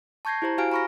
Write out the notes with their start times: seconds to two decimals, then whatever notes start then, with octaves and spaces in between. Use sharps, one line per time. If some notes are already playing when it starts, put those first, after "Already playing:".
0.25 A5 C#6 G6 G#6 A#6 C7
0.42 E4 G4 C5 A#5
0.58 F#4 G4 F5 G#5 F6 D7
0.72 A#5 B5 C#6 F6 A#6